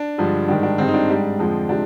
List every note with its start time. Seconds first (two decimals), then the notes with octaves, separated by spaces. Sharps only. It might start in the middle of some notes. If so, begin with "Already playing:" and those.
Already playing: D4
0.18 G2 D3 F3 G#3
0.48 G#2 D#3 G3 D4
0.63 D4
0.78 G2 D#3 G#3 C4
0.88 D#4
0.94 D4
1.09 G#2 G3
1.39 F2 D3 F3 G#3
1.69 C3 F3 G#3 D4